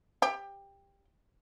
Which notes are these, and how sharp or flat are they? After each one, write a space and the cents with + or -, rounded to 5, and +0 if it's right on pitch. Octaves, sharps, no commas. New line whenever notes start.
G4 +15